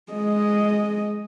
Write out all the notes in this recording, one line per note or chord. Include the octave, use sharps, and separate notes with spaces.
G#3 D#5